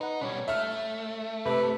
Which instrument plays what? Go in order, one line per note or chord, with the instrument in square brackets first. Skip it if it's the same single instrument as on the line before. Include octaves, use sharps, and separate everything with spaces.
[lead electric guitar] D#4 [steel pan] B4 F#5
[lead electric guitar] B2 G3 [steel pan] C#4 C#5
[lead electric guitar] A3 [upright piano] E5 F6
[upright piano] C3 [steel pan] A4 D6 [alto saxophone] B4